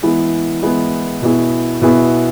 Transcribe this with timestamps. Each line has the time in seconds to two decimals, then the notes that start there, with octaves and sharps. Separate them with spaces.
0.03 E3 G#3 B3 E4 G#4
0.63 E3 G#3 B3 E4 G#4
1.22 B2 B3 E4 G#4
1.81 B2 B3 E4 G#4